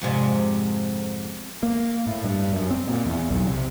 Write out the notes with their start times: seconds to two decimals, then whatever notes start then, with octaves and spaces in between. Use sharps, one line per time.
0.01 F2 G#2 C3
1.63 A#3
2.07 A2
2.25 G2
2.53 F#2
2.71 C4
2.87 A#2
3.06 E2
3.30 B1
3.47 C3